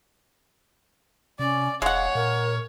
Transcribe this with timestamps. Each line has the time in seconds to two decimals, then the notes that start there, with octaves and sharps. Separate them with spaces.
1.39 C3 C#4 D5
1.82 E1 G#3 C#5 F5 F#5
2.15 A#2 A#4